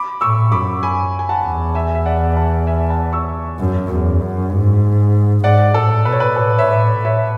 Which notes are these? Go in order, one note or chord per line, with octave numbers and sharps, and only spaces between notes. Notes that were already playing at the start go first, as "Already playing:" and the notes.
Already playing: B5 D6
A2 C#6 E6
F#2 B5 D6
G#5 B5
G#5
F#5 A5
E2
E5 G#5
E5
D5 F#5
F#5 A5
E5 G#5
F#5 A5
C#6 E6
F#2
E2
F#2
G#2
G#2 D5 F#5
A2 A4
B2 B4
C#5
B4
A2 A4 C#5
C#5 E5
A2
A2
C#5 E5